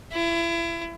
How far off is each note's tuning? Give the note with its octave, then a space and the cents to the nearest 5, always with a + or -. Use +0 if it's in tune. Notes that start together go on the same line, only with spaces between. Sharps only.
E4 +35